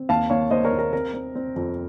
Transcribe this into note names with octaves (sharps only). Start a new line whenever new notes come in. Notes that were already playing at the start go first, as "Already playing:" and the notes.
Already playing: C4
D#2 F5 A5
D#2 C#5 F5
D#2 C5 D#5
A#4 C#5
D#2
A#4
C4 A#4
C4
C4
F2